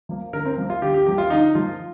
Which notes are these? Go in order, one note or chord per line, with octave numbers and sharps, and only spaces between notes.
F3 A#3
D3 A#4
C4
F3 A#3
F4
D3 G4
G4
F3 A#3 G4
F4
D3 D#4
F3 A#3 F4